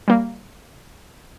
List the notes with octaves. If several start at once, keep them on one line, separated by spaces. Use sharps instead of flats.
G3 A#3